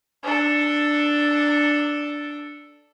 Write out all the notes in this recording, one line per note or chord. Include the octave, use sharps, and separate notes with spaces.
D4 A4